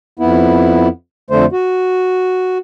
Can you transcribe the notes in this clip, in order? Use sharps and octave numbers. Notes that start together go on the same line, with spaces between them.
F2 B3 E4
F2 D3 A3 C5
F#4